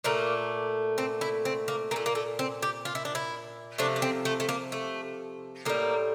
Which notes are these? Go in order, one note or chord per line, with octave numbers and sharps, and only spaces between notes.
A#2 A3 A#3
C4
E4
C4
A#3
A#2 A3 A#3
A#3
A3
C4
G4
F4
E4
D4
E4
C3 F3 A3 D4
D4
C4
A3
A3
A#3
A3
A2 G3 A#3